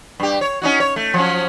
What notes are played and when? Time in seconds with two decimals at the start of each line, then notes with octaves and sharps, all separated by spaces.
0.20 G2 G4
0.41 C#5
0.62 C#4 D#4 F#4
0.80 C#5
0.96 A3
1.14 F3 F#3 C#4